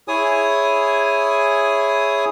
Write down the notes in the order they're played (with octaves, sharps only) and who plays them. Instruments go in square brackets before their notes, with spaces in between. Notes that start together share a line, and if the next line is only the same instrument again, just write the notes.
[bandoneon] E4 G#4 C#5 G#5 D#6